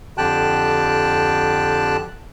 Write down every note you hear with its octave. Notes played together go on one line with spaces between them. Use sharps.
F2 D3 G4 G5 A5 F#6